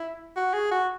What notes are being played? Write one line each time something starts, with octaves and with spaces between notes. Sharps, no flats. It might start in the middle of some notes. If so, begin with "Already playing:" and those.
Already playing: E4
F#4
G#4
F#4